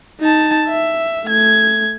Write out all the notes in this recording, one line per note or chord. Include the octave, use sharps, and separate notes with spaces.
D#4 A5
E5
A3 G#6